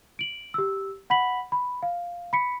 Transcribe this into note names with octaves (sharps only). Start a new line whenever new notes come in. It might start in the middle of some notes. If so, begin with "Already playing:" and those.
D7 F#7
G4 E6
F#5 B5 B6 F#7
B5
F5
B5 B6 C#7